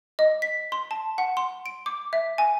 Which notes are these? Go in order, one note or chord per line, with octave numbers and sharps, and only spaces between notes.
D#5
B6
C6
A5
F#5
C6
D7
D6
E5
G#5